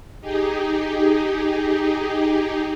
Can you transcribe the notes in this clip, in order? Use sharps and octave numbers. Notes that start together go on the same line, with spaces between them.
D#4 G4 G#4